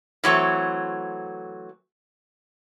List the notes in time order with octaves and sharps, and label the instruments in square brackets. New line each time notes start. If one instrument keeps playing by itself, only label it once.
[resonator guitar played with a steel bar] E3 F#3 A3 C4